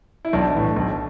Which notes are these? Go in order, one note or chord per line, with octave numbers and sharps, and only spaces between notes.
E4
B1 D4
A2 E3
B1